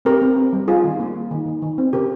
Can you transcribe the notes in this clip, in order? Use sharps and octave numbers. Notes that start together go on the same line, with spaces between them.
C4 G4 A#4
C4
C4
G3
G3 F4 G#4
D#3
A#3
A#3
D#3
D#3
D#3
C4
C#3 G4 A#4